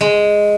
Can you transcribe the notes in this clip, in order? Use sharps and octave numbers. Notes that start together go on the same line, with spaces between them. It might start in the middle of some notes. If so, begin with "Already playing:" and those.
G#3